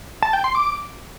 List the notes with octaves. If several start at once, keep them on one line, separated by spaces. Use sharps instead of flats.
A5
G5
C6
D6